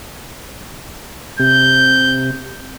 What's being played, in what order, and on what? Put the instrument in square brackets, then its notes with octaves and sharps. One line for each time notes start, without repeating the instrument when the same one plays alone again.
[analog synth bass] C3 [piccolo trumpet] G6